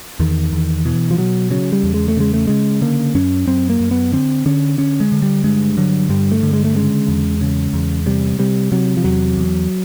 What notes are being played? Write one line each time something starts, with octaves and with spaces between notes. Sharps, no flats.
E2 D#3
E2
B2 E3
F3
B2 F#3
C#3 F#3
G3
E2
G#3
A3
C#3 G#3
A3
C#3 G#3
D3 A#3
F#2 C#4
F#2 C4
A#3
F#2
B3
D3 C4
D3 C#4
D3 C#4
G#3
D3
G3
G2 G#3
D3 F#3
G2 G3
A3
D3
G#3
A3
C#3 G#3
E2
C#3
E2
C3 G3
C3 G3
C3 F#3
F3
E2 F#3
E2